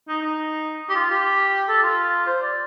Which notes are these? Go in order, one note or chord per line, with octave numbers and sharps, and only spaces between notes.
D#4
D#4
G4
F4
G4
A4
F4
C5
D5